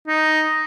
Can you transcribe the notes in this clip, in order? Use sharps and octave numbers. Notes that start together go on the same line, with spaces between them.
D#4